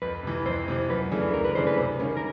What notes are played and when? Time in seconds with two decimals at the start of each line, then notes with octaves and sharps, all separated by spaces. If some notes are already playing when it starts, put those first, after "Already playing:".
0.02 F2 B4
0.23 C3 E3
0.46 F2 C5
0.68 C3 E3
0.90 F#2 B4
1.11 C#3 E3 A3 D4
1.34 F#2 A#4
1.45 B4
1.55 C#3 E3 A3 D4 C5
1.67 B4
1.77 C3
2.00 D#3 G3 A#3 C#4
2.17 A#4